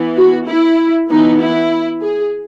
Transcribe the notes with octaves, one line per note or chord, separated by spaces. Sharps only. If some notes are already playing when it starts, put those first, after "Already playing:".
Already playing: E3 B3
F#4
E4
E3 B3 D#4
E4
G#4